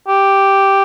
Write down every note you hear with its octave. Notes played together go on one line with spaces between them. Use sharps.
G4